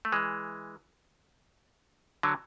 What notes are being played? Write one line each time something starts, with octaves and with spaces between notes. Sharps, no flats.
A3
E3 G#3
D3 F#3